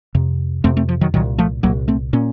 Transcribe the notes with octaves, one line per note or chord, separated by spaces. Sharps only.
F2 C3
F2 C3 A3 C4
A3 C4
F3
D#3 F#3
C2 A#2 D#3 F#3
F3 A3
C2 A#2 F#3 A#3
A3 C4
A#2 A#3 C#4